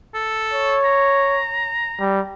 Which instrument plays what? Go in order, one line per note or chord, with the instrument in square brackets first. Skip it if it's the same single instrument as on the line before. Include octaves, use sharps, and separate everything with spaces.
[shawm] A4
[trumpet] C#5
[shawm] A#5
[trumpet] G3